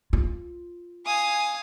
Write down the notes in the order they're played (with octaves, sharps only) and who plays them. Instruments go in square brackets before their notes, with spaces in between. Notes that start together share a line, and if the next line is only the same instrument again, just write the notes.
[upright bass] F4
[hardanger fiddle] F5 D#6 [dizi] G#5